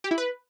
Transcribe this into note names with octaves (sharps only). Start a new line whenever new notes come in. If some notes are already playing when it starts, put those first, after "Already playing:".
G4
E4
B4